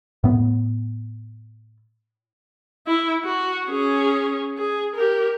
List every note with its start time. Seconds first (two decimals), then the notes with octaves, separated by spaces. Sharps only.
0.24 A2 B3
2.87 E4
3.24 F#4
3.67 C#4 G#4
4.58 G#4
4.96 G4 A#4